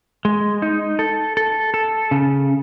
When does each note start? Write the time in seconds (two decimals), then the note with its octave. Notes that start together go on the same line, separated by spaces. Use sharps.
0.25 G#3
0.62 D#4
0.99 A4
1.37 A4
1.74 A4
2.11 C#3